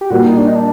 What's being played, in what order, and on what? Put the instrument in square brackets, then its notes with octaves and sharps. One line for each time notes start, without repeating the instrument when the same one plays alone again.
[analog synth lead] G4
[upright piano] A#2 G3 A#3 [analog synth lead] F#4
[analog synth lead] D#4
D4
D#4
D4